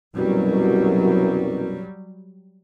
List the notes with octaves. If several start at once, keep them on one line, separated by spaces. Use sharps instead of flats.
C2 F#2 B2 F#3 G3